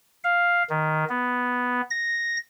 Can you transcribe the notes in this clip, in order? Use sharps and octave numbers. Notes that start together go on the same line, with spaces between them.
F5
D#3
B3
A#6